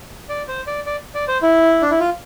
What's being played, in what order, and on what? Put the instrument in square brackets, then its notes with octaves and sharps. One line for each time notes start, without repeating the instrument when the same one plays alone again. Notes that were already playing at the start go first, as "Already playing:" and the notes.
[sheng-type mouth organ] D5
C5
D5
D5
D5
C5
E4
D4
E4
F4